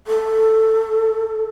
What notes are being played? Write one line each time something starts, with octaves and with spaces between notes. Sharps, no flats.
A4